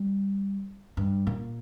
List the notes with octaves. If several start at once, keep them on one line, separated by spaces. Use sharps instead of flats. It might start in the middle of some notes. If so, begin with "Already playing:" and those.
Already playing: G3
G2
A#2